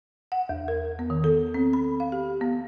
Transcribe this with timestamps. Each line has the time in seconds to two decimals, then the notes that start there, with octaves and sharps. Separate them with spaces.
0.32 F#5
0.49 E2
0.68 A#4
0.99 B3
1.10 D#3
1.24 A4
1.54 C4
1.73 B5
2.00 F5
2.12 G4
2.41 B3